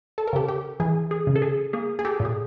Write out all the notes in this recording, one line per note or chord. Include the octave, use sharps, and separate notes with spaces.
A4
A#4
C#3 G4 A4
G4
E3 G#4
G#4
C#3
A4
G#4
A#3 G#4
G#4
G4 A4
A#2
G#4